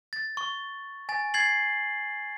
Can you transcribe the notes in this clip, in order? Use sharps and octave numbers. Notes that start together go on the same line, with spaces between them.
A6
C#6
G#5 A6
G#6 A6 C7 F#7